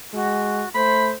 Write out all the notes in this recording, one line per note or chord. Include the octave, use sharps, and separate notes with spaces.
G#3 F#4
A3 C5 B5